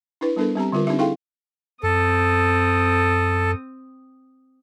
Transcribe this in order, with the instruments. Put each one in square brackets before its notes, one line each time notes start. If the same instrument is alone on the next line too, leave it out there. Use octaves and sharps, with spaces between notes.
[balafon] D4 E4 B4
G3 B3 D4 A4 A#4
G3 C4 G4 A#5
D3 G3 F4 A#4
C4 D4 D#4 G4 E5
E4 G#4 A4 F5 G5 C6
[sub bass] F#2 [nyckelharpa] C4 D#6 [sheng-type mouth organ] A4